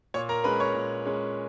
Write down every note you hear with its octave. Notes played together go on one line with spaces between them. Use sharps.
A#2 C#5 C#6
A#4 A#5
G#3 C#4 B4 B5
C#5 C#6
A#2
G#3 C#4